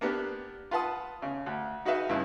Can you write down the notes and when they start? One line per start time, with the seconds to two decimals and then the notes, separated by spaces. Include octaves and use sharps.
0.01 A#3 B3 D4 G4
0.71 F4 B4 F#5 A5 D#6
1.22 C#3
1.46 D2
1.85 D#4 F#4 G#4 B4 E5 F5
2.09 G2 C#3 E4